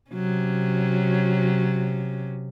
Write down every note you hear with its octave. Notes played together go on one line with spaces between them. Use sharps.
C3 F#3 C#4